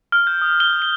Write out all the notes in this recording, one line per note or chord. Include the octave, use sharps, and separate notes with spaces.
F6
G6
D#6
G7
G7